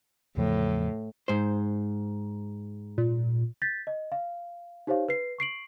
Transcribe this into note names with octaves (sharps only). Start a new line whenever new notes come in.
E2 A2 C#3 F3
G#2 C5
A#2
G6 A6 B6
D#5
F5
D#4 G4 C5 C#5 F5
B4 C7
C#6 C7 D7 F#7